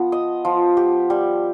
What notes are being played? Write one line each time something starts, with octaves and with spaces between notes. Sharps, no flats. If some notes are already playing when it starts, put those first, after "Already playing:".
Already playing: F3 B3
D#5
F3
G4
G3